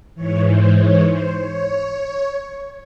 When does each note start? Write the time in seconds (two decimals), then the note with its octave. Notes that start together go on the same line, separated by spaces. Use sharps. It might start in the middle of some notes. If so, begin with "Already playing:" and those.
0.15 G#2 E3 C#5
0.47 C5
0.78 C#5
1.08 C5
1.39 C#5